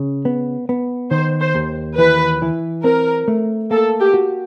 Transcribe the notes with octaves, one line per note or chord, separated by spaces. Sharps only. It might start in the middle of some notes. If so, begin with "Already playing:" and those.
Already playing: C#3
B3
B3
D#3 C5
C5
D#2
E3 B4
E3
C4 A#4
A3
A#3 A4
G4
F#4